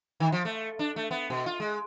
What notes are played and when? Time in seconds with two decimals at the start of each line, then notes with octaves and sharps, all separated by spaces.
0.20 D#3
0.32 F3
0.45 A3
0.79 D4
0.96 A3
1.11 B3
1.30 B2
1.46 F4
1.60 G#3